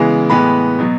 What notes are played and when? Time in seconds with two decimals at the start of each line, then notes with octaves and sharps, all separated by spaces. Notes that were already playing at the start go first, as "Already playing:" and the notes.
Already playing: C#3 E3 G#3 B3
0.30 A2 E3 G#3 B3 B4 B5
0.79 B2 F#3 B3